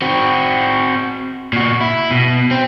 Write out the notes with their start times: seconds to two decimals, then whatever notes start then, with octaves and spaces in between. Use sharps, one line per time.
0.02 C4 F#4
1.53 A#2 F#4
1.81 E4
2.11 B2
2.51 C4